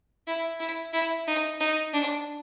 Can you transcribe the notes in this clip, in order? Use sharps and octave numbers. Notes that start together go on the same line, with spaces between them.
E4
E4
E4
D#4
D#4
D4